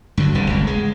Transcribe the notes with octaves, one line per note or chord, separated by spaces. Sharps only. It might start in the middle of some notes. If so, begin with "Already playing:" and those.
G2 D3 D#3 F#3
E1 C2 D3 G3
G1 C#2
G#3